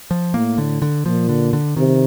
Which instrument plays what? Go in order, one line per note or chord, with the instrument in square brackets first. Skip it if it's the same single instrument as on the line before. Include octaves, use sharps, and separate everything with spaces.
[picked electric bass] F3
[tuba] A2 [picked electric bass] A#3
[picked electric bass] D3
D3
[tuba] A#2 [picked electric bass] F3
[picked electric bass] D3
D3
[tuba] C3 [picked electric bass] D#3